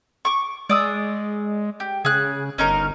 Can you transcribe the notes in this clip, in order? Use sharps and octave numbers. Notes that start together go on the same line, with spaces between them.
C#6 D6
G#3 D5 D#6 E6
G4
C#3 G#4 F#6
G1 C#4 D#4 A#4